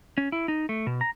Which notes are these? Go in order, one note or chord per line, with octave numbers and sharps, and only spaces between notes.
C#4
E4
D#4
A3
B2
A#5